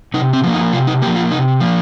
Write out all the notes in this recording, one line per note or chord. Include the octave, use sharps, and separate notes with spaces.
C3 D#4
C4
F3 A#3
D#4
C3 F4
D#4
F3 A#3 G4
F4
C3 D#4
F3 A#3